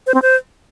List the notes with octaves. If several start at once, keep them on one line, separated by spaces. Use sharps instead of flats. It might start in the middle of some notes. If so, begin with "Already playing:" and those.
C5
C4
C5